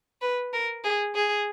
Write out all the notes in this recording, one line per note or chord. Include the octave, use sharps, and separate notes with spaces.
B4
A#4
G#4
G#4